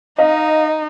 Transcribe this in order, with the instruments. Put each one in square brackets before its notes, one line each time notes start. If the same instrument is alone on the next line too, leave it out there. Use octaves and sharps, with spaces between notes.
[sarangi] D#4 [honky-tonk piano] D#5 F5